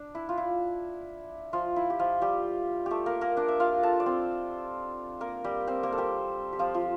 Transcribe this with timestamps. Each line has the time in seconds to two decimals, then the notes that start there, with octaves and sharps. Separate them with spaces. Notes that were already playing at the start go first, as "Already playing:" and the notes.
Already playing: D4
0.15 E4
0.29 F4
0.38 E4
1.53 F3 F4
1.76 E4
1.90 G4
1.99 F3 F4
2.21 G3 G4
2.86 A3 G4 A4
3.06 A#3 A#4
3.21 A#3 A#4
3.37 D4 D5
3.48 E5
3.60 F4 F5
3.83 A4 A5
4.00 D5
4.06 C4 C5
5.21 A#3 A#4
5.44 G3 G4
5.67 C4 C5
5.83 A#3 A#4
5.92 A4
5.98 G3 G4
6.53 G4
6.59 F3 F4
6.74 F3 F4